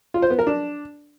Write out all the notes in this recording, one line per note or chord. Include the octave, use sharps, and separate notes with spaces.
F4
C5
B3
A#4
D4